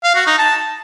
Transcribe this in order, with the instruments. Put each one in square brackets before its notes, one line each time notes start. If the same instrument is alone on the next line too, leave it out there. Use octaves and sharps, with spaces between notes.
[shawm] F5
F#4
D#4
A5